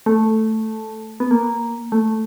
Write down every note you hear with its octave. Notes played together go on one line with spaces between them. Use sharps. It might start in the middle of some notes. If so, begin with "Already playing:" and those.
A3
B3
A#3
A3